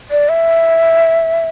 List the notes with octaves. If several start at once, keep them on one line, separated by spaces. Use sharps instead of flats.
D5
E5